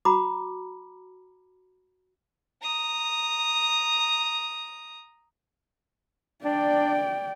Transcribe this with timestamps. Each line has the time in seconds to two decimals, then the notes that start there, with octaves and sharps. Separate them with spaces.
0.05 F#4 A#5 B5 D6
2.61 A#5 D#6
6.45 D4 D5 G5